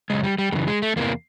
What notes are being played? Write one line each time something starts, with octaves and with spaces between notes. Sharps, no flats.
F#2 C#3 G#3
G3
G3
F#2 C#3 E3 G3
G#3
A3
E2 C3 E3 A#3